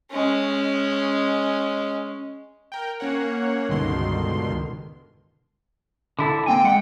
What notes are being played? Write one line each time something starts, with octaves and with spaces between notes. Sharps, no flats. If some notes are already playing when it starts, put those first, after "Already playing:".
G#3 C#4
A#4 G5
A#3 C#4 C#5 F#5
C#2 G2 B2 D3 D#3 C6
D3 E4 A4
A#3 C4 G5 G#5
G#3 F#5